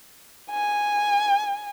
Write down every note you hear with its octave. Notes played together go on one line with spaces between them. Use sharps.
G#5